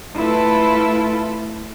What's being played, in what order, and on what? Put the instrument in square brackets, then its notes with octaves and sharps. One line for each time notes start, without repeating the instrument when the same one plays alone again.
[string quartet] A3 E4 F4 A4 B4